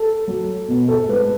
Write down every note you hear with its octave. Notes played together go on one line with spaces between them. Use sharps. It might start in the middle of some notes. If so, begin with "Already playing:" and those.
Already playing: A4
F#3
B2
A4
G#3 B4